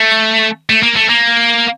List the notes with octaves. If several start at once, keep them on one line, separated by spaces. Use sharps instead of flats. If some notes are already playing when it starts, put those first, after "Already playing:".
Already playing: A3
A3
A#3
A3
A#3